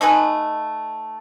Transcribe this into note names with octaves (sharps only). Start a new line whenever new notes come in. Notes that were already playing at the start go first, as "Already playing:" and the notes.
A3 D#4 B4 G#5